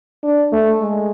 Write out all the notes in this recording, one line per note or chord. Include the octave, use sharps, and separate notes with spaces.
D4
A3
G#3